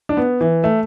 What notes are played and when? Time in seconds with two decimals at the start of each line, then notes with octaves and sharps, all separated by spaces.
0.09 D4
0.17 B3
0.41 E3
0.64 A3